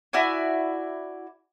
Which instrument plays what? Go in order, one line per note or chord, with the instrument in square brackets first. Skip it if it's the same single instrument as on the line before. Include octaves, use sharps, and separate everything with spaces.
[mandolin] E4 F#4 D5 G#5